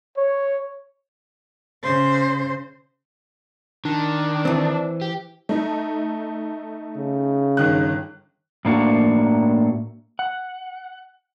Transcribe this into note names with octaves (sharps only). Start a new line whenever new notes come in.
C#5
C#3 C5
D#3 D4
E3 C4
G4
A3 D#4
C#3
G1 D#3 F#6
A2 A#3 D4 F#4
F#5